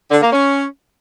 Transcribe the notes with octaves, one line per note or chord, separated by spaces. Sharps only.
D3
A#3
C#4